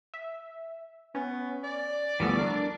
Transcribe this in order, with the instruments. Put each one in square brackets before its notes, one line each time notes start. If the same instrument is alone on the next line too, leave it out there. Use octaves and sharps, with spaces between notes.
[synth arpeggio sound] E5
[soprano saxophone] B3 [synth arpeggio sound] C#4
[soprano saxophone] D5
[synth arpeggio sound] D2 F3 B3 [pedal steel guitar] E3 G3 A3
[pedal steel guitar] D4 [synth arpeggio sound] A#4